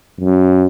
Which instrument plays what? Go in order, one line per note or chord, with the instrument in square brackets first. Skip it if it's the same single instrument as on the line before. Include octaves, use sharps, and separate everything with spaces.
[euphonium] F#2